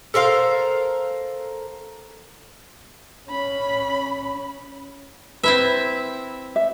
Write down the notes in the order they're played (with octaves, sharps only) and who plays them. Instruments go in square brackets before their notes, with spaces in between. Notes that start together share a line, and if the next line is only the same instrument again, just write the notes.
[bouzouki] A4 A#4 C5 F5
[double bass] C#4 [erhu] B5
[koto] C4 E4 E5 [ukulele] B4
[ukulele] E5